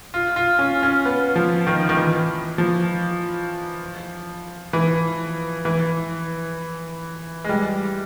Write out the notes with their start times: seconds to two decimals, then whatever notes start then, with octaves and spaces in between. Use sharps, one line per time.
0.14 F4
0.36 F4
0.59 C#4
0.83 C#4
1.05 B3
1.36 F3
1.67 D#3
1.89 D#3
1.97 E3
2.58 F3
4.73 E3
5.65 E3
7.44 G#3
7.49 G3